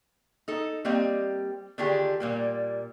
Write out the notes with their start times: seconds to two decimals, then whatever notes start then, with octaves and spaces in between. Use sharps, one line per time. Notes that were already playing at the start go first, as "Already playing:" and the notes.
0.48 D#4 A4
0.85 G3 A#3 C4 D#5
1.78 D3 D#3 D4 F4 G4 G#4
2.20 A#2 G3 A#3